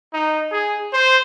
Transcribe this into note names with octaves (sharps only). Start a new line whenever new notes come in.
D#4
G#4
C5